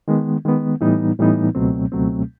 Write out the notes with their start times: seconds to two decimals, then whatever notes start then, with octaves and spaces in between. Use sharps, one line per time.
0.08 D#3 G#3 B3
0.45 D#3 G#3 B3
0.81 A2 E3 G3 B3 D#4
1.19 A2 E3 G3 B3 D#4
1.55 C#2 B2 F#3 A3 C4
1.92 C#2 B2 F#3 A3 C4